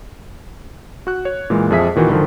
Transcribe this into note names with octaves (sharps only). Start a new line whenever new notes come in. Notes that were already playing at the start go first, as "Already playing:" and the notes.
F#4 F#6
C#5
A#2 E3 G#3
F2 F3 G#4 E5 B6
A#2 D#3 E3 F#4
G2 D3 D#3 F3